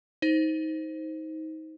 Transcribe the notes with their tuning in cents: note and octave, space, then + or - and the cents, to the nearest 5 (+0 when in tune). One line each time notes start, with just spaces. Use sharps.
D#4 +25 C5 +0